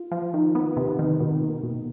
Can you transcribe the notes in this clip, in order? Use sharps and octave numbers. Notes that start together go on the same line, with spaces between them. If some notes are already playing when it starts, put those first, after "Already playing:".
Already playing: F4
F3
D#3
B3
C3
D#3
B2
B2
B2